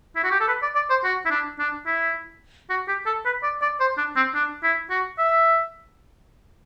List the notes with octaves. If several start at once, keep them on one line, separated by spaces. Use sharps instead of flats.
E4
F#4
G4
A4
B4
D5
D5
C5
F#4
E4
D4
D4
E4
F#4
G4
A4
B4
D5
D5
C5
D4
C4
D4
E4
F#4
E5